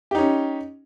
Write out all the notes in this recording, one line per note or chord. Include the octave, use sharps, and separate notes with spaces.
C#4 D#4 G4